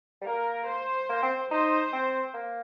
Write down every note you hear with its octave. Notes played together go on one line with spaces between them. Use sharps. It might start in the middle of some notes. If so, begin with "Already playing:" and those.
G3
A#3 A#4
C5
A#3
C4
D#4 C5
C4
A#3